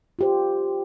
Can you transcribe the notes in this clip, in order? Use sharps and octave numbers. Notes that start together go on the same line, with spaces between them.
F4 G4 C5